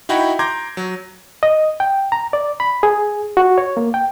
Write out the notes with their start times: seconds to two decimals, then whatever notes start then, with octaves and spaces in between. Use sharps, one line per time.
0.09 D#4 E4 F#4 F#5 G5 B5
0.39 A#5 C6 D6 G6 G#6 A#6
0.77 F#3
1.43 D#5
1.80 G5
2.12 A#5
2.33 D5
2.60 B5
2.83 G#4
3.37 F#4
3.58 C#5
3.77 A#3
3.94 G5